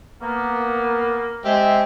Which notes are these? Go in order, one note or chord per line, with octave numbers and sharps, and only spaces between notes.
A#3 B3
G#3 C4 G4 E5